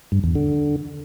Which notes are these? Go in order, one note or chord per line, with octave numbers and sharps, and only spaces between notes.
G2
E2
D3